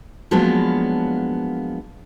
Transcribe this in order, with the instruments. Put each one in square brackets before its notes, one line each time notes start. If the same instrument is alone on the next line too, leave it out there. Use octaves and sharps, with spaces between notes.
[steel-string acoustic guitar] F3 F#3 G#3 A#3 B3 D4